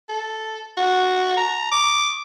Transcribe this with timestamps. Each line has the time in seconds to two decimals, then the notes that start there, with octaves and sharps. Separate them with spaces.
0.09 A4
0.77 F#4
1.37 A#5
1.72 D6